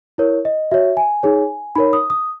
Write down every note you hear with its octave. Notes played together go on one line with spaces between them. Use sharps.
E4 A#4 C#5
D#5
F#4 C#5 E5
G#5
D#4 G#4 C#5
D#4 A#4 C#5 B5
D#6
D#6